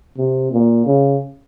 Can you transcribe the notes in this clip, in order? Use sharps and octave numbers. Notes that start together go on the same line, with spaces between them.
C3
A#2
C#3